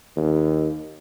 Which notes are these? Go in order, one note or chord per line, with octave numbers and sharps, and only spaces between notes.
D#2